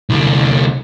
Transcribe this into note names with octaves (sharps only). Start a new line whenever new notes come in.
C2 D3